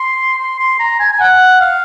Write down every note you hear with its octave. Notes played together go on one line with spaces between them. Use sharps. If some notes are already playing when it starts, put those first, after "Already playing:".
Already playing: C6
C6
C6
A#5
G#5
G#5
F#5
F5